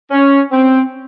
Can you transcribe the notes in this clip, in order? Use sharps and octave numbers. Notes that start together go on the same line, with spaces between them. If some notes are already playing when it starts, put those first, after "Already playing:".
C#4
C4